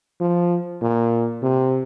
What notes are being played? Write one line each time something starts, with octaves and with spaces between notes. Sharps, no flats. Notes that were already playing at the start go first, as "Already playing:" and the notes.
F3
A#2
C3